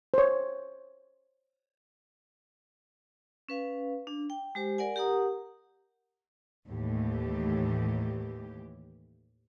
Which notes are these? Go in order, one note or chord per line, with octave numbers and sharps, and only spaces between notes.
C5 C#5
C#4 B4 F5
D4
G5
G#3 G4 C5
A#4 D5 F#5 G#5
G4 A#4 F#5 A#5 D#6
D#2 A2 E3 G4